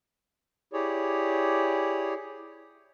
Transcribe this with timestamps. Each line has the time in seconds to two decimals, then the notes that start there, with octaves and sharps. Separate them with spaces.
0.73 E4 G4 G#4 C#5 D5